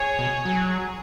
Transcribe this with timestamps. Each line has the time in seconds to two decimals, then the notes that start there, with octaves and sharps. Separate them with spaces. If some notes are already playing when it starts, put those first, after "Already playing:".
Already playing: G#4 C#5
0.19 B2
0.45 F#3 G#4